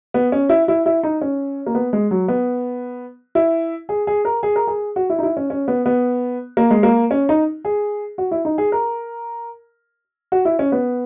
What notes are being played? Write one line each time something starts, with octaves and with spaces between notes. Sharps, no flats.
B3
C#4
E4
E4
E4
D#4
C#4
A#3
B3
G#3
F#3
B3
E4
G#4
G#4
A#4
G#4
A#4
G#4
F#4
E4
D#4
E4
C#4
C#4
B3
B3
A#3
G#3
A#3
C#4
D#4
G#4
F#4
E4
D#4
G#4
A#4
F#4
E4
C#4
B3